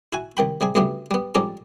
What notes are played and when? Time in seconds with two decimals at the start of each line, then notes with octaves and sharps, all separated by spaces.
0.13 E4 F#4 G#5
0.37 C2 D#3 G5 B5
0.61 C3 G3 G#4
0.75 D2 G2 C#3 G3 A3 B3
1.11 G3 B3
1.35 F2 G#2 G3 C#4 D5 A#5